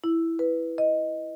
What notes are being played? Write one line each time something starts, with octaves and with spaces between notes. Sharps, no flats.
E4
B4
D#5